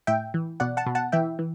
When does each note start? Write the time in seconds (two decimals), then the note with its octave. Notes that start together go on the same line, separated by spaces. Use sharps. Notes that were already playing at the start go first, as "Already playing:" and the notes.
0.07 A2 E5 G5
0.34 E3
0.60 B2 D5 F#5
0.77 F#5 A5
0.86 B2
0.95 F#5 A5
1.12 E3 E5 G5
1.39 E3